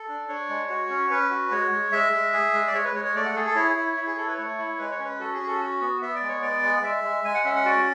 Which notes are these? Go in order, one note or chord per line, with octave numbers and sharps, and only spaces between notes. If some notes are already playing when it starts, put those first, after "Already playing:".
Already playing: A4
D4
D4 C#5
G#3
F#4
C#4
C#4 B4
F#4
G#3 C#5
G#3
G#3 E5
G#3
G#4
G#3
D5
G#3 C#5
B4
G#3 C#5
C#5
A3 D5
F#5
G#4 A4
A4
E4 C#5
E4
E4
G#4
E4 A4
B4
A3 C#5
E4
G#3 B4
C#5
C#4
B4
F#4 A4
G#4
C#4
A4
F#4
B3
B3 E5
D5
G#3
C#5
B3 D5
G#3
G#3 E5
G#3
G#3 G#5
F#5
C#4 E5
F#5
F#4 D5